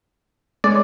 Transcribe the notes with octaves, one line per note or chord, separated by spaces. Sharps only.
G#3 C#5 D5